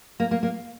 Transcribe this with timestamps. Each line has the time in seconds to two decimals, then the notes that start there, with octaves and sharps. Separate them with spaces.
0.20 A#3
0.31 A#3
0.43 A#3